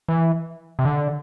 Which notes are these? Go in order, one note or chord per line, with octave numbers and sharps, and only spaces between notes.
E3
C3
D3